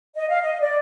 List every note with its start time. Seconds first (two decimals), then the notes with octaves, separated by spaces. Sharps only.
0.15 D#5
0.28 F5
0.42 D#5
0.60 D5